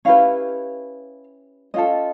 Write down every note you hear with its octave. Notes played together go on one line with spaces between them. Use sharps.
C#4 E4 G4 B4 F5
C#4 F4 A4 D#5